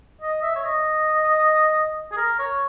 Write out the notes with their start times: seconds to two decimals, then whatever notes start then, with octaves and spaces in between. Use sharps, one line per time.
0.21 D#5
0.43 E5
0.56 C#5
0.65 D#5
2.12 G#4
2.17 A#4
2.39 C#5